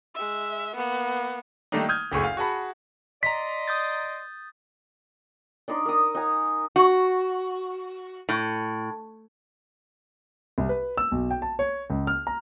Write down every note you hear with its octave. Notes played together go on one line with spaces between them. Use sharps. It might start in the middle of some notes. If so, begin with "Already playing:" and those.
G#3 E5
A#3 B3
D#3 G3 A3 A#3 D4 D#4
D#6 F6 G6 G#6
F#1 D2 D3 G#4 C#6
F5
F#4 G#4 F#5 A5 B5
D5 D#5 A#5 C6 B6
D#6 G6 A6
D4 D#4 D5 C6
A#4 D#6
D#4 F#5 G#5 A#5
F#4
A2
C2
B4
E6
B1
G5
A5
C#5
C#2
F6
A#5